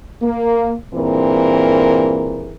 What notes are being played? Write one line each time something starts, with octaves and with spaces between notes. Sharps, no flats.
A#3
G2 A#2 E3 C4 G#4 A#4